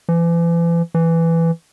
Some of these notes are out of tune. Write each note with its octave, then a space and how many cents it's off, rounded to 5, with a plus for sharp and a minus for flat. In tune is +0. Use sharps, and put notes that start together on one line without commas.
E3 +40
E3 +10